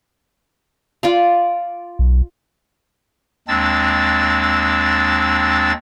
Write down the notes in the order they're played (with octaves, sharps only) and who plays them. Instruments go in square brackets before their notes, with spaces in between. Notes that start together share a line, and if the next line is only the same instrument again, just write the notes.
[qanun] F4 D5 F5
[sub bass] B1
[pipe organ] D#2 G#3 C4 D4 E6 A6